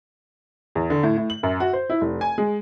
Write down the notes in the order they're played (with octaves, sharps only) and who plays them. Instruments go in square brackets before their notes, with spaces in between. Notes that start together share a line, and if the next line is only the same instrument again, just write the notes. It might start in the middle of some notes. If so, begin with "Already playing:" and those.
[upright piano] E2
D3
A2
A2
F#7
F#2
F#4
C5
E4
F1
G#5
G#3